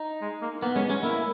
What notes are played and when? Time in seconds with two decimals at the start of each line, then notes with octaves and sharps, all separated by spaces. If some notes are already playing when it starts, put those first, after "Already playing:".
Already playing: D#4
0.21 G#3
0.42 A#3
0.62 A#3 B3
0.75 G#3 C#4
0.90 G#3 C#4
1.03 A#3 E4